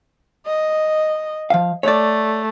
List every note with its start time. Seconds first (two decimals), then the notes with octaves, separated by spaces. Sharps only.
0.46 D#5
1.50 F3 F5
1.83 A3 C#5 D5